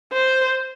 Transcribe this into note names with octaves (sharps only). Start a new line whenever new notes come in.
C5